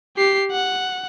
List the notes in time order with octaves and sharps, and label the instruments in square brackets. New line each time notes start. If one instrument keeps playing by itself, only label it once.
[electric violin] G4 C7
F#5